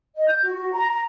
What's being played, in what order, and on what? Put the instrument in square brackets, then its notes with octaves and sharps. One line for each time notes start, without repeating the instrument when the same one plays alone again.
[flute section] D#5
G6
F#4
F#4
A#5
A#5